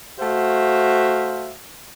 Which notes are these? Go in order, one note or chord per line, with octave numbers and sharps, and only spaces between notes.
A3 F#4 C5 E5 F5